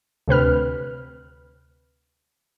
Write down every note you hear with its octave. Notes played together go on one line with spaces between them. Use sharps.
D2 C3 B4 F6